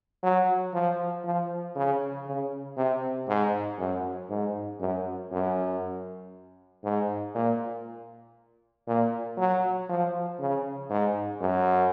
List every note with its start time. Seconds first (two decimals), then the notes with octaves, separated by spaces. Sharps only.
0.23 F#3
0.73 F3
1.25 F3
1.76 C#3
2.26 C#3
2.77 C3
3.28 G#2
3.79 F#2
4.29 G#2
4.80 F#2
5.32 F#2
6.84 G#2
7.35 A#2
8.87 A#2
9.37 F#3
9.89 F3
10.39 C#3
10.90 G#2
11.41 F#2